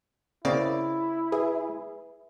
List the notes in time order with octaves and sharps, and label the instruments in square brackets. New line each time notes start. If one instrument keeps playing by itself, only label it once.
[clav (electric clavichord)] C#3 A#3 C4 [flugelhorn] E4 [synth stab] D5
[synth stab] G#4 [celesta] B4 E5